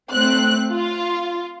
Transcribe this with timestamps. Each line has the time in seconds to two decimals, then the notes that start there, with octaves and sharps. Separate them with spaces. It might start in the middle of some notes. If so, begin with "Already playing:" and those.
0.11 A3 C4 F#6
0.71 F4